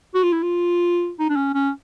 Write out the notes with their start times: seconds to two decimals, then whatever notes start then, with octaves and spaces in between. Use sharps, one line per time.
0.15 F#4
0.23 F4
0.33 E4
0.43 F4
1.19 D#4
1.30 D4
1.36 C#4
1.54 C#4